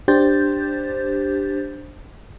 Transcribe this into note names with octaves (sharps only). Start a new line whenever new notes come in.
D4 G4 C5 G6 A6